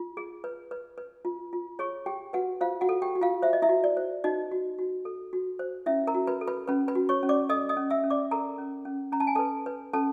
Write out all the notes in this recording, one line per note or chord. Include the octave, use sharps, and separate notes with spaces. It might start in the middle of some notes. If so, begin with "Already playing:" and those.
Already playing: F4
G#4
B4
B4
B4
F4
F4
G#4 C#5 C#6
G4 G#4 G5
F#4 B4 F#5
F4 C5 F5
F#4 F#5
A4
G4 G5
F#4
F4 F5
C5 E5
D#5
E4 E5
F#4
D5
C5
D#4 F#4 D#5
F#4
F#4
A4
F#4
C5
C#4 E4 E5
A#4 A#5
F#4
B4 B5
A4
B4 B5
C#4 B4 B5
B4 B5
F#4
C#5 C#6
C#4
D5 D6
A4 D#5 D#6
D#5 D#6
C#4
E5 E6
C#4
D5 D6
A4 A#4 A#5
C#4
C#4
C#4 A#5
A5
G#5
A4 B4 A5
B4
C#4 A4 A5